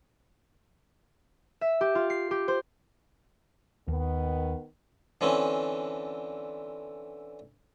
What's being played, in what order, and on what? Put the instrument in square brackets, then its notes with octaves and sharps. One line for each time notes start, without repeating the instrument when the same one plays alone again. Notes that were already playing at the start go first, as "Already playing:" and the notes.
[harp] E5
G4
F4
C7
G4
C5
[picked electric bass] D#2 [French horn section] D#3 B3
[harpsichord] D3 E3 C4 C#4